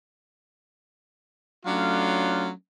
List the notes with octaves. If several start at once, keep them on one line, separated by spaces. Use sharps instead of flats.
F#3 A3 C#4 D4 F4 F5